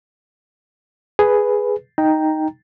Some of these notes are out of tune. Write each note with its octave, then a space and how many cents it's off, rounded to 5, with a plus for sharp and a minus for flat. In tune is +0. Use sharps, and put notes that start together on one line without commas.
G#4 +0 B4 +0
D#4 +0 G5 +0 A#5 +0